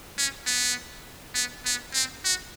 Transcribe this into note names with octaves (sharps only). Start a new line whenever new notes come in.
C#4
B3
B3
B3
C4
F#4